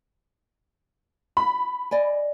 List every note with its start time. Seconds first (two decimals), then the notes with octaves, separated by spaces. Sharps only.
1.37 B5
1.91 D5 D#5 G#5